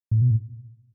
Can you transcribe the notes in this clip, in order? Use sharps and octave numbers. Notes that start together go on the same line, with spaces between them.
A2
B2
A2